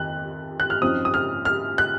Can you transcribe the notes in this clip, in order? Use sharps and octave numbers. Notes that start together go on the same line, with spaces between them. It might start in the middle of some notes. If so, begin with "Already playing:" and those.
Already playing: F2 D#3 F#6
F#6
F6
F#2 F3 C4 D#4 D#6
D#6
F6
F6
F#6